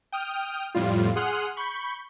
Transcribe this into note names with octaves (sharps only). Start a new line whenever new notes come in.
G5 D#6 F6
F2 A2 G3 F4
G#4 F#5 C6 D#6 F6 F#6
B5 C#6 G6